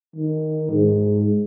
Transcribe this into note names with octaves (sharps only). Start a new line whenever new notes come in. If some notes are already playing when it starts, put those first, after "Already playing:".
D#3
G#2